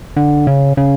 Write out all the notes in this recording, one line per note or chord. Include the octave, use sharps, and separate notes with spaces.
D3
C#3
C#3